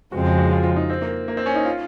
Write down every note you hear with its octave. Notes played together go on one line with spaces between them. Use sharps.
F2 C#3 F3 G#3 C4 F#4
F#4
F#4
F4
F4
D#4
C4
A#3
A#3
C4
C#4
D#4
F4